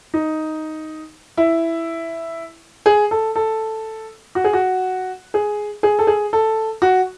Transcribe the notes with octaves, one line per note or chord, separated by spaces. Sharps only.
D#4
E4
G#4
A4
A4
F#4
G#4
F#4
G#4
G#4
A4
G#4
A4
F#4